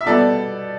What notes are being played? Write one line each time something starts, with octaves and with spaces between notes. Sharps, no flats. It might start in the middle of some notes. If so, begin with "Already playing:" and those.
E5
B2 G3 B3 A4 D5